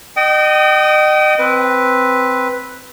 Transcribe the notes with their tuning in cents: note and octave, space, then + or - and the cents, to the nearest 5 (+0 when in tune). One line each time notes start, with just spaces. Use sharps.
D#5 -30 G5 -35 D#6 +0
C4 +0 B4 +0